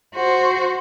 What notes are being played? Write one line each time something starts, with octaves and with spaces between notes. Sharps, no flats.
F#4 C5